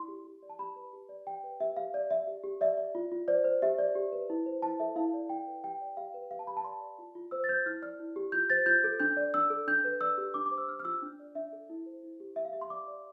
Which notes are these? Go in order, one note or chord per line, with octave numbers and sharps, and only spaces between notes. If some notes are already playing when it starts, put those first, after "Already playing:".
Already playing: E4 D5 C6
G4
G4
D5
A5
G4 B5
B4
G4
D5
G4 G5
B4
G4 E5
G4 F5
D5
D5 E5
G4
G4
D5 E5
D5
F4
F4
C5 D5
C5
G4 E5
D5
G4
B4
E4
C5
E4 A5
A4 E5
E4 F5
D5
E4 G5
B4
G4 G5
D5
G4 F5
B4
G4 F5
A5
G4 B5
A5
D5 C6
D5
F4
F4
C5 E6
A6
C5 G6
E4 F6
D5 F6
E4
G4
F4 G6
C5 A6
F4 G6
A4
D4 G6
D5
D4 E6
A4
D4 G6
B4
D5 E6
G4
D4 D6
D6
C5
E6
D4 F6
F6
F4 E6
D4
D5
D4 E5
A4
E4
C5
E4
G4
G4 E5
F5
G4 E5
C6
D5 D6
D5